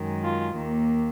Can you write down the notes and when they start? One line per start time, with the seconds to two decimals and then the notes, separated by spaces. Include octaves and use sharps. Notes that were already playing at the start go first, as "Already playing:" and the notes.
Already playing: F#2 D#3 G#3
0.23 F4
0.57 D#2 D#3 A#3